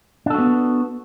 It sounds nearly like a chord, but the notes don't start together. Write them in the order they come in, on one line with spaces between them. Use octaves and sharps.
D4 A4 F#4 B3